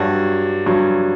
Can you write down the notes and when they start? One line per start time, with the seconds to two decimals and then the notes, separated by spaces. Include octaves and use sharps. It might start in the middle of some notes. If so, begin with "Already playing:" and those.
Already playing: G2 F#3 F#4
0.66 G2 F#3